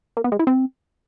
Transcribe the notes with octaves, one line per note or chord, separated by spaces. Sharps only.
A#3
B3
G#3
E4
C4